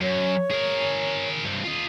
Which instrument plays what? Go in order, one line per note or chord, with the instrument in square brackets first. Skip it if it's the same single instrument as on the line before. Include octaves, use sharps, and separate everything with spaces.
[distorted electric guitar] F#2 [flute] C#5
[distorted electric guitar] G#4 A#4
G2 C4
F4 D#5